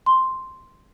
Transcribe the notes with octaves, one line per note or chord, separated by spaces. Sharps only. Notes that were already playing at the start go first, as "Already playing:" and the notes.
C6